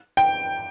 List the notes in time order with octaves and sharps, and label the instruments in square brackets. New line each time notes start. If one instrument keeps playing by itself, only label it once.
[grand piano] G5